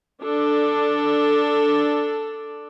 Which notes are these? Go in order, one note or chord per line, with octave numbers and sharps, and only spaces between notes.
D4 A4